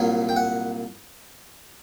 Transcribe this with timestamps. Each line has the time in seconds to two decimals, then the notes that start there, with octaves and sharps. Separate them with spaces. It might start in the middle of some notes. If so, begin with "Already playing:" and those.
Already playing: C2 A#2 F#3
0.29 G5
0.36 F#5